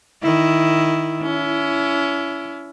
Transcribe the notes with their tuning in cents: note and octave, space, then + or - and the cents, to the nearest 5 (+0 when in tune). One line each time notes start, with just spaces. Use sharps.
D#3 +0 E4 +0
C#4 +30 E4 +20